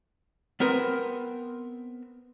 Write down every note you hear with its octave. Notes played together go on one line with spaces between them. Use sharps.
B3 C4 A#4 B4